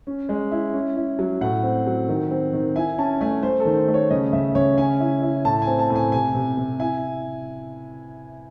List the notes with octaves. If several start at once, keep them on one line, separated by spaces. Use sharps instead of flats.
C#4
G#3
E4
C#4
E4
F#3
A2 F#5
C4
F#3
D#3
C4
D#3
E4 G#5
C#4 A5
A3 G#5
A3 C5
A4
D#3
C5
A3
C#5
C#3 D#5
C#3 E5
C#3 C#5
C#4 G#5
E4
E4
A2 A5
G#5
C4
A5
A2
G#5
C3 G#5
C3
C3
E4 G#5